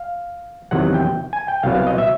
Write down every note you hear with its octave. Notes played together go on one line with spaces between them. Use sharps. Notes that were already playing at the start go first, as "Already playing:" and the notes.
Already playing: F5
E2 C3 D#3 F#3 F#5
G5
G#5
G5
C2 B2 F#3 F5
F5
D#5
E5